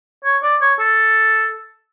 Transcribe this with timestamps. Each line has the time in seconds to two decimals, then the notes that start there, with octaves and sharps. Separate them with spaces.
0.25 C#5
0.43 D5
0.62 C#5
0.79 A4